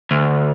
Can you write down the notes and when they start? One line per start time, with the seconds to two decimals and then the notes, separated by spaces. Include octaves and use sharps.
0.11 D2